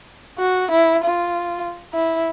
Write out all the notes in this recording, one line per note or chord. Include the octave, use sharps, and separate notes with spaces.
F#4
E4
F4
E4